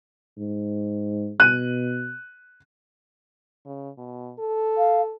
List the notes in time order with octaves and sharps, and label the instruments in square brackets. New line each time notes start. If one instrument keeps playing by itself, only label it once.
[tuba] G#2
[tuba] B2 [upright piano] F#6 D#7
[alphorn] C#3
B2
A4
[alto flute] F5